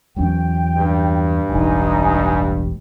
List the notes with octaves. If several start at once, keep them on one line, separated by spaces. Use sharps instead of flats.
E2 F#3 C#4 G5
G2
E1 A1 D#4 G#5